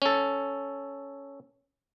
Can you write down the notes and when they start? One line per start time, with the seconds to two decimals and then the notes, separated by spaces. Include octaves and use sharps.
0.02 C#4 A4